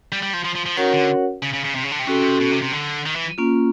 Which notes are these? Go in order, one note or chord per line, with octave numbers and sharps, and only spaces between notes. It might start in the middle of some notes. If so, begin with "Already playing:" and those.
G3
G3
F3
F3
F3
F3
D#3 C#4 F#4 A#4 C#5 F#5
D3
C#3
C#3
C#3
C3
C#3
D3
C3
C#4 F#4 A4
B2
C3
C3
D3
D#3
E3
A#3 C#4 F4